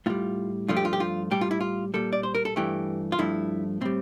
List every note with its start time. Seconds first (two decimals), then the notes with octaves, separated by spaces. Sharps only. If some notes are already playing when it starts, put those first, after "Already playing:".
0.06 A2 G3 F4
0.68 G2 F3 A3 F4
0.77 G4
0.85 F4
0.93 G4
1.00 F4
1.31 A2 G3 G4
1.41 F4
1.51 E4
1.61 F4
1.94 A#2 G3 A4
2.13 D5
2.23 C5
2.35 A#4
2.45 A4
2.56 G2 E3 A3 G4
3.12 F4
3.19 G2 F3 A3 E4
3.81 A2 G3 C4